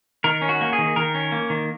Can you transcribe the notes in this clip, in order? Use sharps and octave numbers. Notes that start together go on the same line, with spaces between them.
D#3 A#4
C#4
F#4
A#3
G#4
D#3
D#3 A#4
C#4
A#3
D#3